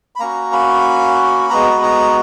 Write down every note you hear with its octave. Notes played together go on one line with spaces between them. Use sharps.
B5
A#3 C#4 F#4 A#5
B5
G#3 B3 F#4 A#5
B5
A#5